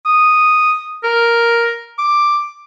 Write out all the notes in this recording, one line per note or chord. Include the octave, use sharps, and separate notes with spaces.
D#6
A#4
D6